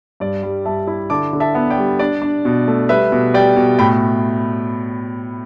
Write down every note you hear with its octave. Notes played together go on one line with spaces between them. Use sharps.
G2 D5
G3
G2 E5 A5
E4
D3 A5 D6
D3
E5 A5
B3
D5 G5
G3
D4 D5
D4
B2
A3
G3 B4 E5
B2
G3 D5 G5
B2
A2 G5 B5